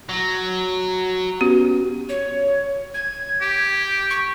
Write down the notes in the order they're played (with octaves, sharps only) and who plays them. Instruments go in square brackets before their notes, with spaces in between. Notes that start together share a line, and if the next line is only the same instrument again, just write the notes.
[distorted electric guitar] F#3
[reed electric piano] B3 C#4 G4 [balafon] F#4
[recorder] C#5
G#6
[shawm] G4
[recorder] C#6